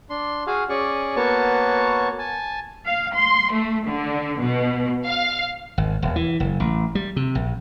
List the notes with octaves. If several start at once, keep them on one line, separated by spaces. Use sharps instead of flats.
D4 C6
F#4 G#4 F5
C#4 G#4 D5 C#6
A#3 B3 F#4 C#5 A5 C#6
G#5 A5
F5
C6
A3
D3
B2
F5
G#1
D#1
E3
F#1
A1
G3
C3
A#1